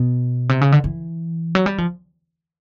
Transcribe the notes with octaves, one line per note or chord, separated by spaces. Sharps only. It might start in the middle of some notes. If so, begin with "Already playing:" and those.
Already playing: B2
C3
C#3
D3
E3
F#3
G3
F3